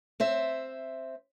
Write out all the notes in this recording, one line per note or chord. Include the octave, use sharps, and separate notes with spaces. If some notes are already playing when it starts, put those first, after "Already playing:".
C4 C5 E5